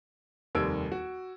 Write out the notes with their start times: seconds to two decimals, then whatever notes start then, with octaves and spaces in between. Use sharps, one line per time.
0.55 F1 D#2 G3 E6 G#6 D7
0.92 F#4